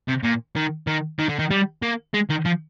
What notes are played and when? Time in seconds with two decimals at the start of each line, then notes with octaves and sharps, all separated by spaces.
0.08 C3
0.24 A#2
0.56 D#3
0.87 D#3
1.19 D#3
1.29 D3
1.39 D#3
1.51 G3
1.82 A#3
2.14 G#3
2.30 D#3
2.45 F3